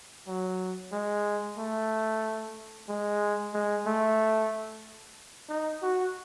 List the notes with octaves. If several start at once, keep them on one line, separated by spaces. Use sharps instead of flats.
F#3
G#3
A3
G#3
G#3
A3
D#4
F#4